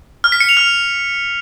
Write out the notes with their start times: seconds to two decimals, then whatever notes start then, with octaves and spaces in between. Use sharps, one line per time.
0.24 F6
0.32 B6
0.40 C#7
0.49 F7
0.57 F6